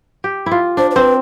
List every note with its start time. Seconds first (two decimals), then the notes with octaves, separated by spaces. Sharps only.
0.24 G4
0.46 E4
0.51 F4
0.77 D4 C5
0.91 C5
0.95 C4 B4